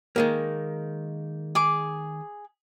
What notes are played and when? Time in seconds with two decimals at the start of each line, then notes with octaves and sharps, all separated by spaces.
0.16 D#3 G#3 A#3
1.55 G#4 D6